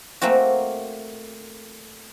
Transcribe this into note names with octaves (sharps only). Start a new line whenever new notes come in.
A3 A#3 C4 F#4